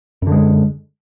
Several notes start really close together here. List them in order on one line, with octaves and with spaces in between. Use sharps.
F#2 D3 G#3